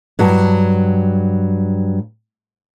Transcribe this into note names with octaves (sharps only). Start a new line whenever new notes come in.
G2 F#3